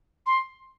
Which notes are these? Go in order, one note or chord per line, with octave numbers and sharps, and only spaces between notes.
C6